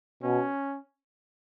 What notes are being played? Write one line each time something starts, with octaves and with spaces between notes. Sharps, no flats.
B2 C#4